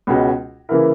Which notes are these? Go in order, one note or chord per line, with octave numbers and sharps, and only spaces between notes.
C#2 B2 G#3 C#4 F#4
C#3 E3 A#3 E4 A#4